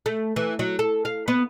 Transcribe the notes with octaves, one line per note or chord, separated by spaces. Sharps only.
A3
E3
F#3
A4
F5
B3